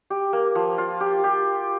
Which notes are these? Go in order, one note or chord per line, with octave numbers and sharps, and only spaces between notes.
G4
A#3
F3
F4
G4
G4